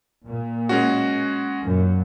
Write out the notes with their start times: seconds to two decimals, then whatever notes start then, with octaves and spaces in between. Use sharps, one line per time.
0.25 A#2
0.69 G#3 C#4 F#4
1.61 F#2 A#2